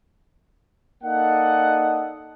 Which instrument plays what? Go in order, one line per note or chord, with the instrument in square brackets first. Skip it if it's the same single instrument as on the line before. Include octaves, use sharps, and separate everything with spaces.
[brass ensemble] A#3 D#4 A4 D5 D#5 F#5